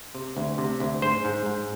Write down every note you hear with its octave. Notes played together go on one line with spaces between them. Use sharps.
C3
D2
C3
D2
G#2 C5
G#2
G#2